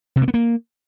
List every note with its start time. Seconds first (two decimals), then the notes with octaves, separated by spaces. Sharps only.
0.16 C3
0.22 A#3
0.28 B3
0.34 A#3